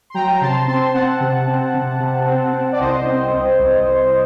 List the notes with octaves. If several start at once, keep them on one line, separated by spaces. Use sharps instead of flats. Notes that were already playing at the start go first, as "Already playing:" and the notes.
C6
F#3 G5 A#5
C3 A5 C6
C4 A5 C6
C4 F#5 A5
C3
C4
C3
C3
C4
C4
D5
C2 C5 D#5
C4
C4
C2
C2